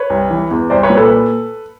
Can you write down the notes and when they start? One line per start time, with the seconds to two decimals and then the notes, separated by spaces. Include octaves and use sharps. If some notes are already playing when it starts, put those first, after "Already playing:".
Already playing: B4 C#5
0.10 C2
0.30 E3
0.51 E2
0.70 C2 C5 D5
0.83 B4 C#5
0.90 A#2
0.97 A4 B4